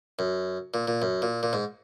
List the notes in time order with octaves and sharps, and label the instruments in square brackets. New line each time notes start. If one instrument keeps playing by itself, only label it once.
[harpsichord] F#2
A#2
A#2
F#2
A#2
A#2
G#2